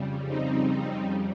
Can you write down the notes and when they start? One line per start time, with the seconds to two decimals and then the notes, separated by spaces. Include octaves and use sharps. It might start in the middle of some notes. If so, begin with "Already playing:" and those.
Already playing: F2 C#3 G3
0.26 C4 D#4